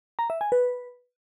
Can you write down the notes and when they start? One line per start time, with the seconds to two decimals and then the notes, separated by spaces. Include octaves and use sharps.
0.19 A#5
0.30 E5
0.41 G#5
0.52 B4